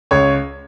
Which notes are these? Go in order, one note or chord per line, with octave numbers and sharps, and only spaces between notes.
C#2 C#5